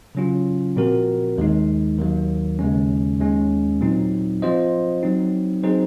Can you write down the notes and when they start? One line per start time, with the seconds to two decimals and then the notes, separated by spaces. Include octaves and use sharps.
0.15 C#3 F#3 C#4 F4
0.76 A#2 F3 C4 F#4 A#4
1.38 D#2 D#3 G#3 D#4
1.99 D#2 D#3 F#3 A#3
2.59 D#2 C#3 G#3 C#4
3.20 D#2 D#3 G#3 C#4
3.81 A#2 F#3 C4 D#4
4.42 F3 C4 F4 C5 D#5
5.03 F#3 C4 D#4
5.64 F#3 C4 D#4 G#4 C5